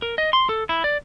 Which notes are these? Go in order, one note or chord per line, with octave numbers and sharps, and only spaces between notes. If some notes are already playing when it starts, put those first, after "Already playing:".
A#4
D#5
C6
A4
E4
D5